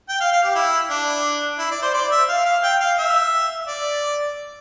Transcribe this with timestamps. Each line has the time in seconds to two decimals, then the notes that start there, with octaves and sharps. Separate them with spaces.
0.09 G5
0.20 F5
0.32 F5
0.43 G4
0.55 E4
0.90 D4
1.59 E4
1.71 D5
1.82 C5
1.94 D5
2.11 E5
2.29 F5
2.45 F5
2.63 G5
2.80 F5
2.98 E5
3.68 D5